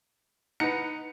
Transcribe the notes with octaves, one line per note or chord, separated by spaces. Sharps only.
D#4 B4 F#5 A#5 C#7